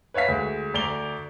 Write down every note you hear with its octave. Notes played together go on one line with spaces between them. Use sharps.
B4 C#5 E5 F5 B6
D2 G#3
D2 D5 A#5 F7 G7